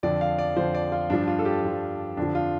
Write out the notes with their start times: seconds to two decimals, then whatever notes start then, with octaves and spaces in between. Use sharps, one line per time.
0.03 F2 D3 F3 D5
0.21 F5
0.39 D5
0.57 F2 D3 F3 C5
0.75 D5
0.92 F4
1.10 G2 F3 D4
1.28 F4
1.39 A4
1.45 G4
1.64 G2 F3
2.17 F2 D3 F3 D4
2.35 F4